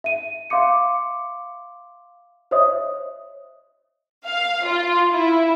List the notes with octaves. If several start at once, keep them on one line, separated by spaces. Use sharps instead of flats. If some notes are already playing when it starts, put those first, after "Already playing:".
E5 D#7
E5 F5 C6 D6 C#7
C5 C#5 D#5 E5 D#6
F5
F4
E4